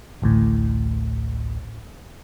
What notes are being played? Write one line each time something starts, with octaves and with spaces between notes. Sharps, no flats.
A1 D2 A2